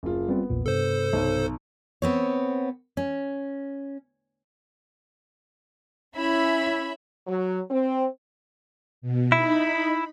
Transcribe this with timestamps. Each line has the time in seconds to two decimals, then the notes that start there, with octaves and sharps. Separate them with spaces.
0.03 F#1 F4
0.29 G3 B3 C4 F4
0.50 A#1 E2 A#2
0.66 G2 C3 A4 C5
1.13 B1
2.02 B3 C4 C#5
2.97 C#4
6.17 C#4 E4 E5 B5
7.27 F#3
7.70 C4
9.02 B2
9.32 D#4 E4 B5